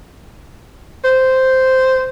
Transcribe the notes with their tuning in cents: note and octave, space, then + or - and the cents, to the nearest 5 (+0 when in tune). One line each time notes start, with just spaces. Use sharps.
C5 -5